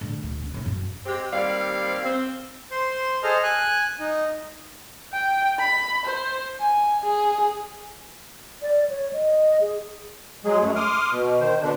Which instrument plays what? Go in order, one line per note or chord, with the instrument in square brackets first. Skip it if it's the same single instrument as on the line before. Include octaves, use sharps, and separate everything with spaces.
[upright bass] D3 A3
D2
C#2
C2 A2
F#2 C#4
[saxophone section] G#3 C4 G4
D#2 G3 C4 D5 F5
C4
[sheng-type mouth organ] C5 C6
G#4 A4 C5 D#5 F6
G#5 F#6
D#4
[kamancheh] G5
B5
C5
G#5
G#4
[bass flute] D5
C#5
D#5
G#4
[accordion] F#3 G#3 G#4
F#2 A3
C6 D6 D#6 F6
B2
D#3 C5
B2 D3 D4